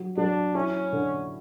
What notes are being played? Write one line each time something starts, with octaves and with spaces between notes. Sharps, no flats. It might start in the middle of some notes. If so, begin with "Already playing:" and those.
Already playing: F#3
F#3 D4
C#4 E4
D3